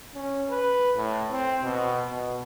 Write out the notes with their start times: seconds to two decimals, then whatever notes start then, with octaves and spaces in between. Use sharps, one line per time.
0.14 C#4
0.50 B4
0.96 A2
1.30 C4
1.62 B2
2.10 B2